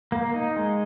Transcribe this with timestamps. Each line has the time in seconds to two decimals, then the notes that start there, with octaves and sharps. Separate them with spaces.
0.12 A#3
0.34 D#4
0.56 G#3